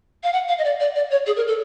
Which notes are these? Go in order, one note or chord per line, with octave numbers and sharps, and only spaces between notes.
F5
F#5
F5
D#5
D5
D5
D5
C#5
G#4
A#4
A4